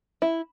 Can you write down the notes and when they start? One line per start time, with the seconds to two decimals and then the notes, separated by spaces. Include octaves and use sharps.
0.22 E4